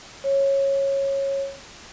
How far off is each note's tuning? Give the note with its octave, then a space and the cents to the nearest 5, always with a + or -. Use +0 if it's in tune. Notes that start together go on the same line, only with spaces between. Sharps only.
C#5 -15